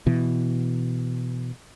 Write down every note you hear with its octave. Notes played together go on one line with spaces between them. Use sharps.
B2 E3